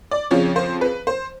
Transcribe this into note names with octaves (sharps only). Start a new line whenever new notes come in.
D5
F2 C#3 F3 C#5
C5
B4
C5